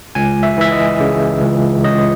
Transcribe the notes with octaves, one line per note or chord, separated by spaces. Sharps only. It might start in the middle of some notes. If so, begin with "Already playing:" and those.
C#2 G#5
E5
E3 E5
D#5
C#3
C#2
C#2 D#5